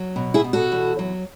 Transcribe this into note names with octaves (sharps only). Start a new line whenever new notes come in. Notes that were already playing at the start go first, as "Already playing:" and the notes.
Already playing: F#3
B2
E4 G#4
B2
F#4 A4
E2
F#3